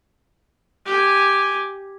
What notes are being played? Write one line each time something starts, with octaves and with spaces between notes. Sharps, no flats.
G4 G#5